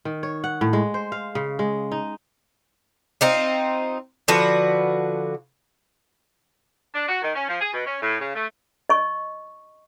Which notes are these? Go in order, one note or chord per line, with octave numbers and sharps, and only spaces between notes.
D#3
C#5
F#5
A2
G#3
C5
F5
C#3
G#3
D#4
C4 D#4 F4
D3 F3 F#4 B4
D4
F#4
D#3
C#4
F3
G#4
B2
C#4
A2
C#3
A3
D#5 C#6